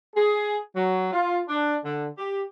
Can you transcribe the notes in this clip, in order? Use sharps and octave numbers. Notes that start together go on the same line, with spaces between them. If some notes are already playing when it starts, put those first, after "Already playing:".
G#4
F#3
F4
D4
D3
G4